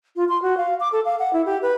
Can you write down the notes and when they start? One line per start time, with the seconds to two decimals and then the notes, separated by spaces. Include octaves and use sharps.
0.16 F4
0.29 C6
0.42 F#4
0.57 F5
0.80 D6
0.92 A4
1.05 F5
1.19 F#5
1.33 E4
1.46 G4
1.62 B4